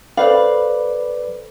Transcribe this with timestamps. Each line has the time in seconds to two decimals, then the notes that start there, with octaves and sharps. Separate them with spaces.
0.17 A4 B4 C5 D5 F5 B5